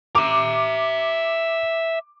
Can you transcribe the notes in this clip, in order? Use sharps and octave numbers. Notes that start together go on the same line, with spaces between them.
E5 A#5 D6